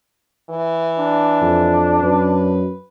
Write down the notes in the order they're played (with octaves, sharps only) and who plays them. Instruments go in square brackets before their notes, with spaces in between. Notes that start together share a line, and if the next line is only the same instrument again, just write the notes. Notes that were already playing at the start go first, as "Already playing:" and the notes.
[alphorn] E3
[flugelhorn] D4
[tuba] F2
[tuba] F#2 [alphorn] B4